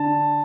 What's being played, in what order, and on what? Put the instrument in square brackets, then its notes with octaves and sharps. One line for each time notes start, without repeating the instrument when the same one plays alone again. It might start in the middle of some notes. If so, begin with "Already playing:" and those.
Already playing: [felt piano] D3 A5